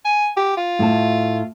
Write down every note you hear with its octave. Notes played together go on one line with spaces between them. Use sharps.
G#5
G4
F4
A2 A5